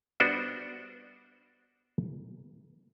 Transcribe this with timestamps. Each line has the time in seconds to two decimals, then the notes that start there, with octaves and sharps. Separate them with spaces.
0.20 G3 B3 D4 F#4 C5